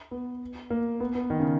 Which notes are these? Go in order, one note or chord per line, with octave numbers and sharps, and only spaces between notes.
B3
A#3
B3
B3
D#3
C#3